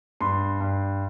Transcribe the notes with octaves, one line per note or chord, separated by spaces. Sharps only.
G2 C6
G2